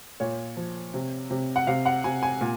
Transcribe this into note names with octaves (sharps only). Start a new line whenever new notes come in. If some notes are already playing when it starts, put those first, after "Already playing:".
A#2 C#5
F3
C3
C3
F#5
C3 F5
F#5
C3 G#5
G#5
A#2